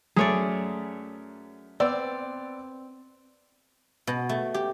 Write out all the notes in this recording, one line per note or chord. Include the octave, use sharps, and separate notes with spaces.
F#2 A3 G#4 C#5 D5
B3 C4 D5 E6
B2
A3
G4